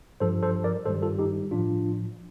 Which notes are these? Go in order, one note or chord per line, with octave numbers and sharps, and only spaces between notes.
G2 F3 A4 C5
A4 C5
A#4 D5
G2 D#3 G3 A4 C5
F4 A4
D#4 G4
A2 F3 D4 F4